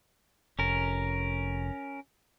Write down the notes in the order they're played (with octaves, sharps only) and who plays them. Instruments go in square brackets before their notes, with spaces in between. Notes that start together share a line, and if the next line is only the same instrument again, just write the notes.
[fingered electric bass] F1 [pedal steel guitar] C#4 A#4